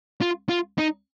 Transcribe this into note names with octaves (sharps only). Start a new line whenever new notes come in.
F4
F4
D#4